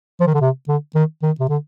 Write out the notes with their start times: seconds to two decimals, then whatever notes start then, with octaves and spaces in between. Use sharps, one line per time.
0.20 F3
0.27 D#3
0.35 D3
0.41 C3
0.68 D3
0.95 D#3
1.23 D#3
1.40 C3
1.49 D3